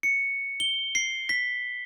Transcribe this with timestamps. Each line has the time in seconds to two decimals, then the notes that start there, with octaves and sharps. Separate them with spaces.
0.03 C#7
0.60 G7
0.95 C7
1.29 B6